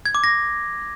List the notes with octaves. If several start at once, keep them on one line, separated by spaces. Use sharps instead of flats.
G#6
D6
A#6